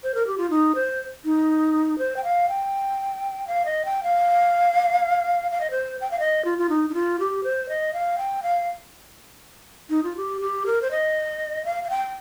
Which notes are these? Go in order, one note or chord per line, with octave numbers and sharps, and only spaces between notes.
C5
A#4
G4
F4
D#4
C5
D#4
C5
G5
F5
G5
F5
D#5
G5
F5
F5
D#5
C5
G5
F5
D#5
F4
F4
D#4
D#4
F4
G4
C5
D#5
F5
G5
F5
D#4
F4
G4
G4
A#4
C5
D#5
F5
F5
G5